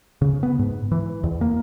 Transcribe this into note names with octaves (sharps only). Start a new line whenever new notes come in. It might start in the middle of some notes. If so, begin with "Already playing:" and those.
C#3
B3
G#2
E3
E2
A#3